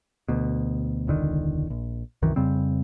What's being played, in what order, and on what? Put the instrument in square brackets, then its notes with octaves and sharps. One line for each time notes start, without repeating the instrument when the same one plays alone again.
[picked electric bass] D2 B2
E1 C#2 D3 D#3
A#1
C2 F#2 D#3 E3
F2 C#3 G3 C4